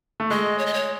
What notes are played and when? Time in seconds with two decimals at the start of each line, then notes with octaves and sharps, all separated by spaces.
0.20 A3
0.31 G#3 D#5
0.58 C#5
0.66 D#5
0.74 C#5